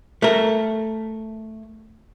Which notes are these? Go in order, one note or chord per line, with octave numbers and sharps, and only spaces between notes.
A3 A#4